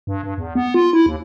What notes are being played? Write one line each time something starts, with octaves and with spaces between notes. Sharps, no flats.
G2
G2
E2
B3
F4
E4
D#2